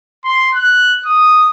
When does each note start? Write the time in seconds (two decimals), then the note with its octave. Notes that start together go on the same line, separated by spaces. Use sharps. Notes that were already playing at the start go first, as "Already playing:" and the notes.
0.24 C6
0.55 F#6
1.06 D#6